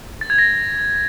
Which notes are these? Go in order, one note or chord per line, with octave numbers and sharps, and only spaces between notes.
A6
G#6
A#6